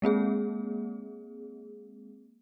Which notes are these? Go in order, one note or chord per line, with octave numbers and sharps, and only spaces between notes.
G#3 A#3 C4 G#4